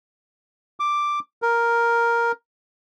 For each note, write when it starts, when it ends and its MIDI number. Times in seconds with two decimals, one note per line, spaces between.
0.80 1.19 86
1.42 2.32 70